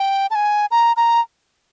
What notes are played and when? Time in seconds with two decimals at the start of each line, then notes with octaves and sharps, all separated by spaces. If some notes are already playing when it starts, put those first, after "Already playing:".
Already playing: G5
0.31 A5
0.35 G#5
0.71 A#5
0.97 A#5